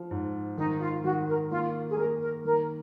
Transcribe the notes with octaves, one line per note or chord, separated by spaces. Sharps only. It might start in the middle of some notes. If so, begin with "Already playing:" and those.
Already playing: F3
G#2
D#3 D#4
F4
D#3 F#4
A#4
A#3 F4
G#4
A#3 A#4
A#4
D#3 A#4